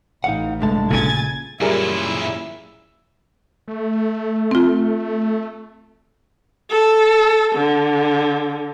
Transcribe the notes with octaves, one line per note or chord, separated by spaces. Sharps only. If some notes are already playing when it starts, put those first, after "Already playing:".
A1 E3 D#4 F5 F#5
C2 G2 D3 G#3 A3 A5
A#2 C#3 G#5 G#6 A6
F#2 A#2 G3 E4 G#4 A#4 E5
A3
C4 F4
A4
D3